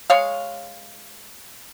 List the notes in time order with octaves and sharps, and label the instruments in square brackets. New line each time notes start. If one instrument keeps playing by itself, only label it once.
[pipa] G#3 C#5 F5